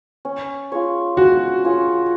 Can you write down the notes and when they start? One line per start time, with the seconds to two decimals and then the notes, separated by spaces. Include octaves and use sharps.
0.25 C#4
0.72 F4 G#4 C#5
1.17 C#4 F#4
1.65 F4 G#4 C#5